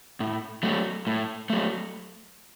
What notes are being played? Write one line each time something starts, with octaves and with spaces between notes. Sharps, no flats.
A2
F#3 A3
A2
F#3 A3